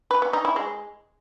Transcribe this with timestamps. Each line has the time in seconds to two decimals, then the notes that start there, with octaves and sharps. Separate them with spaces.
0.11 B4
0.22 B3
0.33 D#4
0.45 E4
0.56 G#3